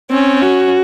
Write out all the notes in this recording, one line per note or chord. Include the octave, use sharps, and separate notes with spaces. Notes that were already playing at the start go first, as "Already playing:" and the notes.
C4 C#4
F#4